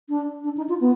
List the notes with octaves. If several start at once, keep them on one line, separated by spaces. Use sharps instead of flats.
D4
D4
D#4
F4
B3